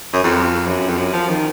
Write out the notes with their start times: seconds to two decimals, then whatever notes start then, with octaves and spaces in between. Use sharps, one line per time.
0.13 F#2
0.24 F2
0.66 F#2
0.89 F2
0.97 F#2
1.13 F3
1.29 D#3